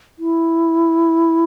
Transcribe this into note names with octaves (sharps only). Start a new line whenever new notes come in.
E4